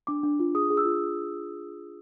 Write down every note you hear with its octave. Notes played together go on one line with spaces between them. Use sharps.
D4 D6
D4
F4
G#4 D#6
G#4
E6
F4